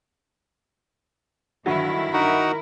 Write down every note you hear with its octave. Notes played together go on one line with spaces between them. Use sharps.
G2 D3 D#3 F#3 E4
D#4 F#4 A#4 F#5